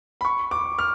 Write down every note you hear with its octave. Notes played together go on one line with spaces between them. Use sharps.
B5
C#6
D6
F6